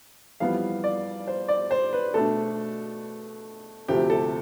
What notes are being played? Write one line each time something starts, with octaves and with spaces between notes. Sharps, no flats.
F2 E3 G3 B3 F5
D5
C5
D5
C5
B4
B2 A3 D4 A4
D2 C3 F3 A3 G4
A4